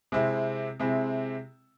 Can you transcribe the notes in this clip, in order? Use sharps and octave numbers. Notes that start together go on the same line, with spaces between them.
C3 G#3 C4 E4
C3 G#3 C4 E4